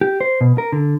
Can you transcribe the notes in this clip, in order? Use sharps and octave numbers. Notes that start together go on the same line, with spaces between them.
G4
C5
B2
A#4
D3